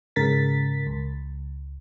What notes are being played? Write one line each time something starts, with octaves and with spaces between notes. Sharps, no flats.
G#2 C#3 A#4 A6 B6
C#2